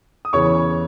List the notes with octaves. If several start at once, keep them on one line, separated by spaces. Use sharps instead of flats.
D#6
E2 C#3 E3 C#5 C#6